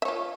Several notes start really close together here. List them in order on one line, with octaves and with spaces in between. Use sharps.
E5 C#5 F4